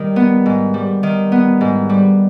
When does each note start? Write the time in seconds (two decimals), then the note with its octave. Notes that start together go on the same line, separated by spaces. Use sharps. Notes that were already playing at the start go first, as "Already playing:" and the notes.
Already playing: D#3 G3
0.16 B3
0.46 G#2
0.74 G3
1.03 D#3
1.32 B3
1.61 G#2
1.89 G3